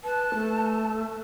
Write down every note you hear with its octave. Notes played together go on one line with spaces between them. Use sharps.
B4 A5
A3